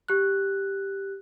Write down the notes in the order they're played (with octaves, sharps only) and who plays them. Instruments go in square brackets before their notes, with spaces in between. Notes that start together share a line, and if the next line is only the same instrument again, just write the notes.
[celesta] G4 F#6